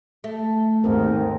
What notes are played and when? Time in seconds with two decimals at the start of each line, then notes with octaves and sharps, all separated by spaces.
0.24 A3
0.84 D#2 G#2 C4 A#4